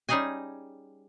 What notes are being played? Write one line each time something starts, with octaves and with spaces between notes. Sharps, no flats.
G3 C#4 D#4 G#4 D#5 G#5